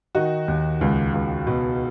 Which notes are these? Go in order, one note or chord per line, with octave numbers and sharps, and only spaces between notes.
D#3 D#4 F#4
D#2
C#2
C#2
B2